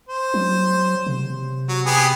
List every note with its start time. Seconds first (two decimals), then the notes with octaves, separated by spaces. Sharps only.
0.09 C5
0.34 F#3
1.07 C3
1.69 F#3
1.86 B3 G4 G#4